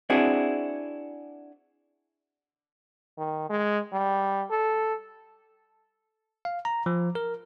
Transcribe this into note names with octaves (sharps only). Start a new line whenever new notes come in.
C4 D4 E4 F#4 G#4
D#3
G#3
G3
A4
F5
A#5
F3
A#4